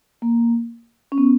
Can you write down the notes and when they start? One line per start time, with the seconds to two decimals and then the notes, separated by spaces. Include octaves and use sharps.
0.22 A#3
1.12 C#4
1.18 B3